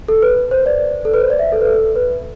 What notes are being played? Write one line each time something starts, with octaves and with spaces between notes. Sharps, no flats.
A4
B4
C5
D5
A4
B4
C5
D5
E5
A4
B4
A4
B4